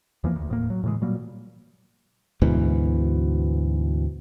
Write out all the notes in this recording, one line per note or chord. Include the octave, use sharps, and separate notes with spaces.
E2 E3 F3 A#3
D2
D#1 A2 A#3
F#3
A2 C#3 E3 G#3
A#2 F#3 G3 A#3
D2 G#2 B2 E3